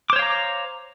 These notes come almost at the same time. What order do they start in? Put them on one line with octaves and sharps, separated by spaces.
D6 C5 C#5 F5 A#5